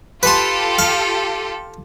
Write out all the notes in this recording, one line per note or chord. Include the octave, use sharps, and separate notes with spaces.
F4 G4 A4 B4 C6
F5